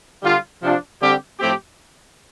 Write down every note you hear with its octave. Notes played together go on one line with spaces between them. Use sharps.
D3 G3 F4
C3 F3 D4 F4
D3 G3 C4 G4
A2 F3 A3 C4 G4